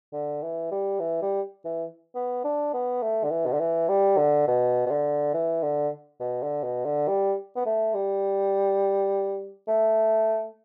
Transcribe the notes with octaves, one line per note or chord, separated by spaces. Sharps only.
D3
E3
G3
E3
G3
E3
B3
D4
B3
A3
D3
E3
B2
D3
E3
G3
D3
B2
B2
D3
E3
D3
B2
D3
B2
D3
G3
B3
A3
G3
A3